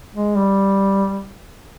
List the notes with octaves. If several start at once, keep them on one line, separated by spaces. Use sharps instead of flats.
G#3
G3